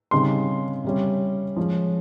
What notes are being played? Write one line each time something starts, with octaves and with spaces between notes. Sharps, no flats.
C#3 G3 C4 D#4 C6
C3 G3 C#4
F3 G#3 C#4